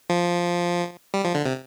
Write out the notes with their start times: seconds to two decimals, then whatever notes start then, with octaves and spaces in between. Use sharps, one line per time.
0.10 F3
1.14 G3
1.25 F3
1.35 D3
1.45 C3